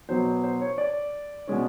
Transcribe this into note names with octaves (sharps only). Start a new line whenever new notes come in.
B2 F#3 B3 C5
C5
C5
C#5
D5
B2 G#3 C#4